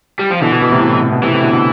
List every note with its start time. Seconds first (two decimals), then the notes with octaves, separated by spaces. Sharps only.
0.19 G3
0.31 F3
0.42 B2 D3 E3
0.52 B2
0.62 B2
0.72 A2 C3
0.82 B2
0.88 A2
0.93 B2
1.02 A2 C3
1.12 B2
1.23 A2 C3 E3
1.33 A2 C3
1.43 B2 D3
1.53 B2 D3